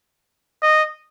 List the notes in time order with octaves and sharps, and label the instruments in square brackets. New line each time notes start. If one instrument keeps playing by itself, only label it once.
[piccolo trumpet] D#5